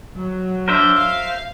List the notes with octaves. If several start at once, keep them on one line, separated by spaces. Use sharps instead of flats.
F#3
D4 A#4 C5 E5
F5